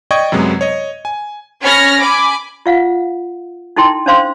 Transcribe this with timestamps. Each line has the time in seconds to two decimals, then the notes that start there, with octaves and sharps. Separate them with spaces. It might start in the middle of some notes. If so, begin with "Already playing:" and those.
0.11 D5 D#5 G5 C#6 D#6 G#6
0.32 F#2 C3 F#3 G#3 B3
0.61 C#5 D#5
1.05 G#5
1.62 C#4 C#5 B5 F6 A#6
2.00 G#5 B5 D6
2.66 F4 F5 F#5
3.76 D#4 E4 A4 G5 C6
4.06 C#4 D4 C5 F5 C6